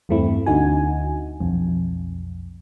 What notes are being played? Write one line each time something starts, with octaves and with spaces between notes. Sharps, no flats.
E2 G2 A3 C4 E4
D2 D3 D#4 F#4 G#5
B1 F2